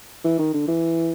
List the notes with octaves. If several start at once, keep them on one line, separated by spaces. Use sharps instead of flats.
E3
D#3
D3
E3